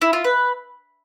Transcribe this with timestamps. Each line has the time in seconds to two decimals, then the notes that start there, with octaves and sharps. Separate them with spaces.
0.02 E4
0.13 F4
0.24 B4